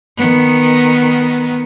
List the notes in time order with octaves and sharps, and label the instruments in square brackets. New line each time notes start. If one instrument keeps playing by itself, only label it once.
[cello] D#3 B3